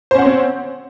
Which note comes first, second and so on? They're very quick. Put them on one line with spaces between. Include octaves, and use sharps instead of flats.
C5 C#4 F#5 C#5 C4